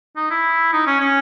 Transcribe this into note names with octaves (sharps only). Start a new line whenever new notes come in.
D#4
E4
D#4
C#4
C#4